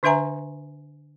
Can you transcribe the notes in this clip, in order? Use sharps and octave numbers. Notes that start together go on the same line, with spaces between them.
D3 D4 B4 E5 G#5 A#5